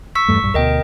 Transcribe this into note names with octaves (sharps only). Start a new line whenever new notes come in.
C#6 E6 B6
E2 G2 A3
A#1 G2
D2 B2 A#4 D#5 G5